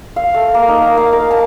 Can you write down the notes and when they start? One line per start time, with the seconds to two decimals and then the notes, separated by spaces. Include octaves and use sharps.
0.16 F5
0.34 A3
0.54 A#3
0.68 D#4
0.82 A#5
0.97 F5
1.13 A#4
1.31 A5